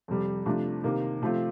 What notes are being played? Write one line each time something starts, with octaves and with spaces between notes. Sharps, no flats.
F2 C3 G3
C3 F3 A3 D4
C3 D#3 A#3
C3 F3 A3 C4 F4